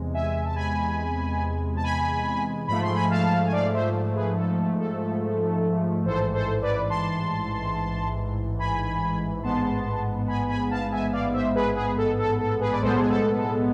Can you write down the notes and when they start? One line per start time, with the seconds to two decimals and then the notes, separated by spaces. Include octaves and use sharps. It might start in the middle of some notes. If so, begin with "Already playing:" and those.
Already playing: E2 C3 G#3
0.14 E5 G#5
0.45 A5
0.56 G#5 B5
1.76 A5
1.83 G#5 B5
2.67 G#2 F3 A3 B5
2.82 C6
2.94 G#5 B5
3.10 F5 A5
3.46 G#5
3.52 D5 F5
3.73 C5 E5
4.15 G#4 B4
4.37 A4
4.79 A4
6.05 A1 G#2 E3 A4 C5
6.34 A4 C5
6.62 B4 D5
6.90 A5 C6
8.59 G#5 B5
9.43 A1 G#2 G#3 B3 A5 C6
10.27 G#5 B5
10.49 G#5 B5
10.70 F5 A5
10.91 E5 G#5
11.12 D5 F5
11.33 C5 E5
11.55 G#4 B4
11.76 G#4 B4
11.97 A4
12.19 A4
12.40 A4
12.60 G#4 B4
12.72 D5
12.81 B1 A2 G#3 B3 A4 C5
12.99 G#4
13.10 A4
13.38 A4